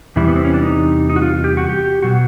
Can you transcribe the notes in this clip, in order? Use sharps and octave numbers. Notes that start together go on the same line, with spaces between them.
E2 C3 E3 G3 E4
B3
C4
C#4
D4
D#4
D#4
F#4
F4
G4
F#4
G4
B2 F#3 F#4